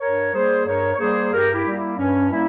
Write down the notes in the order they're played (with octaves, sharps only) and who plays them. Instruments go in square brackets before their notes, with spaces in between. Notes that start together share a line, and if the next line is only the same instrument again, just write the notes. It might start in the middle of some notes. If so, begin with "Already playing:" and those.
[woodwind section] G2 A#4 C#5
G3 A#3 G#4 C5
G2 A#4 C#5
C#5
G3 A#3 G#4 C5
G2 G4 A#4
E4 G4
G3 A#3
E4
G2 C#4
G3 A#3 E4